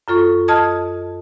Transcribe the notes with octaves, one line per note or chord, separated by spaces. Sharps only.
F#2 F4 A4 C#6
D#5 A5 D#6 F6 G#6